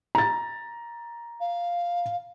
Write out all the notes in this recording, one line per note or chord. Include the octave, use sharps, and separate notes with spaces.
A#5 A6
F5